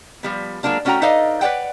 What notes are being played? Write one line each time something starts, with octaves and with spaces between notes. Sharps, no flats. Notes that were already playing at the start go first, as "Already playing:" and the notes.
F3 G3 B3
F#3 G#3 A#3 D4 F4
A3 C#4 D4 F#4 G5 A#5
D#4 A4 B4 D5 D#5 F5
B4 C#5 D5 F#5 G5